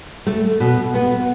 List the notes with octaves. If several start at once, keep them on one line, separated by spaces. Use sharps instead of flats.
A3
B2
B3